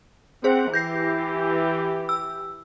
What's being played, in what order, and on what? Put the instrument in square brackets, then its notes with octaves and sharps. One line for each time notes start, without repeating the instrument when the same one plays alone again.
[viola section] C4 F#5 [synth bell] G#4 C5
[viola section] E3 G4 [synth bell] G6 A#6 C7
[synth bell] E6